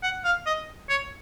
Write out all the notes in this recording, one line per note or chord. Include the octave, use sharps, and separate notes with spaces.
F#5
F5
D#5
C#5